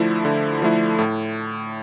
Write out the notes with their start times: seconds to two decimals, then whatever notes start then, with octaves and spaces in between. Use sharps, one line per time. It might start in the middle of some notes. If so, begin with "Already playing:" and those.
Already playing: D3 F3 A3 E4
0.25 D3
0.62 F3 A3 E4
0.99 A2